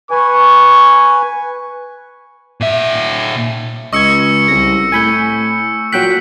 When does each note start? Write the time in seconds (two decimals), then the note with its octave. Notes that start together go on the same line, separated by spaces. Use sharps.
0.11 B4 G#5 C#6
2.61 A#2 E5
3.93 C#2 D#5 C#6 E6 G#6 C#7
4.48 C2 A#6
4.92 A2 G#5 B5 G6
5.93 A#2 F#3 G5 F#6 B6